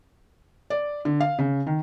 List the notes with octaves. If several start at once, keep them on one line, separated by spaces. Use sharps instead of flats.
D5
D3
F5
C#3
D#3